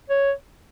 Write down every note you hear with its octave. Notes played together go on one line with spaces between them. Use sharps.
C#5